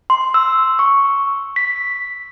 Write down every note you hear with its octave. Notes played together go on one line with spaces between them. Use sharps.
C6
E6
C#6
B6